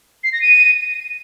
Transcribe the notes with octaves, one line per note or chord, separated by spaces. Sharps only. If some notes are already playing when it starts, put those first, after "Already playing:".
C7
A#6
D#7